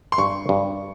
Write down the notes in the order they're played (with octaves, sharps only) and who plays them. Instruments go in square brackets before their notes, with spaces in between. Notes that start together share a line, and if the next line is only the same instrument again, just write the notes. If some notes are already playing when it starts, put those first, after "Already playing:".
[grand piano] C6
[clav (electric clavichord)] G2 [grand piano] C#6
[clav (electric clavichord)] G2